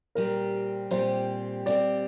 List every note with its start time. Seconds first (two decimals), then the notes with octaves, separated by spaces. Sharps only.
0.15 A#2 G3 C4 G4 A#4
0.91 A#2 G3 C4 G4 C5
1.66 A#2 G3 C4 G4 D5